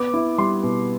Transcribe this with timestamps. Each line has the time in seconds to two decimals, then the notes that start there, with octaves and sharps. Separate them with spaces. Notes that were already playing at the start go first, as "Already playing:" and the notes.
Already playing: B3 D6
0.14 E4
0.38 G3 C6
0.63 B2